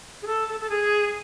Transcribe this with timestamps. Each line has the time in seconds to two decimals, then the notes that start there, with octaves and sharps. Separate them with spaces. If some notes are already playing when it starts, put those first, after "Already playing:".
0.22 G#4
0.27 A4
0.48 A4
0.60 A4
0.70 G#4